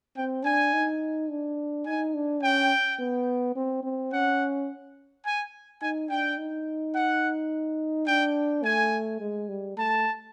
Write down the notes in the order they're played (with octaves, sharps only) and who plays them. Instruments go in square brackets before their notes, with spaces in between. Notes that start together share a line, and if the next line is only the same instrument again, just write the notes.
[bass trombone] C4 [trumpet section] G5
[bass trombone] D4 [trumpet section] G#5
[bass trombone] D#4
D4
[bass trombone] D#4 [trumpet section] G#5
[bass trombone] D4
[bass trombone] C#4 [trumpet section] G5
[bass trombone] B3
C4
C4
[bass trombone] C#4 [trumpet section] F#5
[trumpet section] G#5
[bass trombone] D#4 [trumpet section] G#5
[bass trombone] D4 [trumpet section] G5
[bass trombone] D#4
[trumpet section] F#5
[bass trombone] D4 [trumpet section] G5
[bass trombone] A3 [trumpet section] G#5
[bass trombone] G#3
G3
[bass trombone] A3 [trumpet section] A5